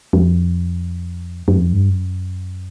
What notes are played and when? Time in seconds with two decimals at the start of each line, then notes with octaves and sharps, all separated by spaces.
0.13 F2
1.48 F#2
1.57 F2
1.73 G2
1.89 F#2